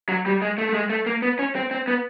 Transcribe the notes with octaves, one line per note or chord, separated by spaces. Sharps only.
F#3
G3
G#3
A3
A3
G#3
A3
A#3
B3
C#4
C4
C4
B3